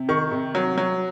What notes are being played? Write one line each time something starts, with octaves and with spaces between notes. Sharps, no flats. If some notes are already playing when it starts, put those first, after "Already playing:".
Already playing: C3
D#3 C#6
C3
F#3
F#3